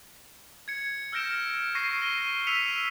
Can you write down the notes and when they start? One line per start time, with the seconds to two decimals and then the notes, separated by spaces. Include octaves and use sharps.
0.68 G#6 C#7
1.12 E6 F6 G6 A#6 D7 E7
1.75 C#6 A#6 C7 D#7
2.02 A#6 D#7 G7
2.47 E6 B6 C#7 D#7 F7